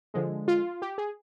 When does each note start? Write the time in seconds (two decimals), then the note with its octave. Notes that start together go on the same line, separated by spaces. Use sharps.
0.14 D3 F3 G#3
0.48 F4
0.82 G4
0.98 G#4